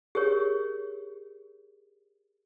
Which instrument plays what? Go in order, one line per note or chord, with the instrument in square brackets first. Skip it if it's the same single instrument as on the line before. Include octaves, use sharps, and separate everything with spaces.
[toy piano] G4 G#4 A#4 C#5